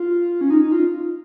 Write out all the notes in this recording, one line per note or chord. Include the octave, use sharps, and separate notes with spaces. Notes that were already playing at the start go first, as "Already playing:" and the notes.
Already playing: F4
C#4
D#4
D#4
F4